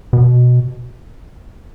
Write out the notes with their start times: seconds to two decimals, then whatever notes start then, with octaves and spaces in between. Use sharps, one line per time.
0.13 B2